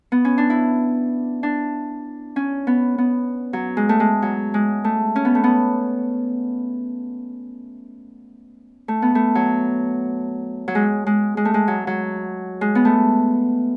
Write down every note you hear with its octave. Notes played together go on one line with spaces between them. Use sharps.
B3
C#4
D4
E4
D4
C#4
B3
B3
F#3
G#3
A3
G#3
F#3
G#3
A3
C#4
B3
A3
B3
A3
B3
A3
F#3
F#3
G#3
G#3
G#3
A3
G#3
F#3
F#3
G#3
B3
A3